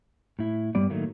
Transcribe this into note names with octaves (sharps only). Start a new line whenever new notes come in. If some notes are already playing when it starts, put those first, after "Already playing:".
A2 E4
G2 G3 B3 D5
A2 D#3 F#3 A3 A#3